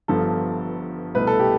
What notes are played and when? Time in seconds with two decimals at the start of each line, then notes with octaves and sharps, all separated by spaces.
0.08 G1 G2 F3 B3 A4
1.15 C2 B2 A3 B4
1.27 A4
1.40 G4